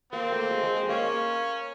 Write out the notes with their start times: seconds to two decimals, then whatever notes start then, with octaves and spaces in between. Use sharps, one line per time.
0.13 A#3 C4
0.32 A3
0.51 G#3
0.64 G#3
0.77 G#3
0.89 A#3 C#4